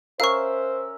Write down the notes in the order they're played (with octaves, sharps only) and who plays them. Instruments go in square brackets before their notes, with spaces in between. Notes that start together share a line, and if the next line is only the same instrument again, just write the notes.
[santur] C#4 A#4 E5 [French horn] C5 [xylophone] F5 C#6